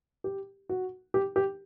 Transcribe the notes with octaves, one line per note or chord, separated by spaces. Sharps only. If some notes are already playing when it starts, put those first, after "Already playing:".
G4
F#4
G4
G4